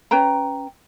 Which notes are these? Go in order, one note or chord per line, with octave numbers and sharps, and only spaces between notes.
C#4 B4 G5 A#5